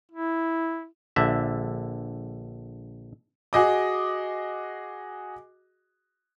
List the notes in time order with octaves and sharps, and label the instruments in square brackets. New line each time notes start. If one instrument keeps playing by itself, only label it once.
[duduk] E4
[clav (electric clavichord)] A#1 D3 E5
[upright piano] F#4 G#4 D#5 D6